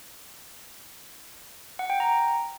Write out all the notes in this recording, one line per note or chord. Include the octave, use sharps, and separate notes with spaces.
F#5
G5
A#5